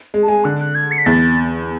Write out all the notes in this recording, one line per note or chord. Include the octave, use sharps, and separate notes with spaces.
G#3
A5
G#3 G#5
D3 F#6
F#6
G#6
C#7
B6
E2 A6